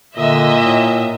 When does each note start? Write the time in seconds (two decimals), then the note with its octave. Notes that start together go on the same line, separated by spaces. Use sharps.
0.18 A#2 D3 D#5 E5
0.63 A2